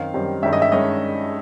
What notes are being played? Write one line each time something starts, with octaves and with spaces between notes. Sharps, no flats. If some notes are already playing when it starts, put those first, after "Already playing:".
Already playing: F#2 D#3 C4 F5
F#2 D#3 G3 C4
G2 D#3 G#3 C#4 E5
D#5
E5
D#3 G#3 C#4 D#5